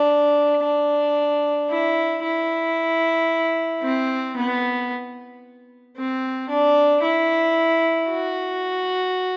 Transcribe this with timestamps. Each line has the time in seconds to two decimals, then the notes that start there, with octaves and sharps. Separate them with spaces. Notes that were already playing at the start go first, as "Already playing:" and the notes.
Already playing: D4
0.63 D4
1.70 E4
2.23 E4
3.83 C4
4.36 B3
5.96 C4
6.49 D4
7.03 E4
8.09 F#4